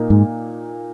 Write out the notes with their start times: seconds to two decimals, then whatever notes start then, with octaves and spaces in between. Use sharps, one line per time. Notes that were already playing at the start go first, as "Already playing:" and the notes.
Already playing: A#2 A#3 D#4
0.10 G#2